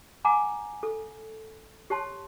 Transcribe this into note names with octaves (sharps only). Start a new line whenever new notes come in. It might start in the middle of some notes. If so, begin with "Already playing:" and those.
F#5 G#5 A#5 D6
A4
G4 C#5 A5 C6